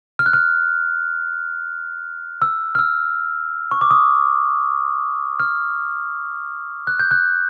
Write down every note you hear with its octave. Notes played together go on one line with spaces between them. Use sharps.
F6
F#6
F6
E6
F6
E6
C#6
D6
D#6
F6
F#6
G6
F#6